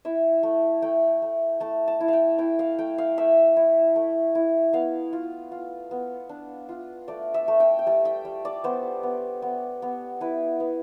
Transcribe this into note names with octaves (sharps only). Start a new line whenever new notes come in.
E4 E5
A3
A3 G5
A3
A3 A5
A5
E4
F5 G5
E4 G5
F5
A3 G5
F5
A3 E5
E4
A3
E4
B3 F5
F4
F4
B3
D4
F4
A3 D5
E5
A3
G5
G5
G3 A5
G5
G3
D5
B3 C5
B3
B3
B3
E4 B4
B3